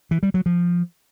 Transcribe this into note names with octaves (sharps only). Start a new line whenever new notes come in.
E3
G3
F#3
F3